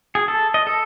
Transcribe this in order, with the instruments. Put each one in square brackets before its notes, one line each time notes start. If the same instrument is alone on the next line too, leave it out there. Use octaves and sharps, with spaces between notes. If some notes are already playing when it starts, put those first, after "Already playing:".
[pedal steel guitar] G#4
A4
D#5
A4